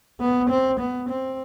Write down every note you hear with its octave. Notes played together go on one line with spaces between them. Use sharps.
B3
C4
B3
C4